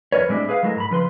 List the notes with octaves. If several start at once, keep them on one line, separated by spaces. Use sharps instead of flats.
F2 D#3 A#4 B4 C#5
A2 G3 G#3 C4 D4 E4
G#4 B4 F5
F#3 G#3 A3 E4 A#4
G#2 A#5 B5
C#2 F3 B4 C6